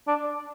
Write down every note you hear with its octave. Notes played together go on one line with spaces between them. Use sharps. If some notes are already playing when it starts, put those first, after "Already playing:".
D4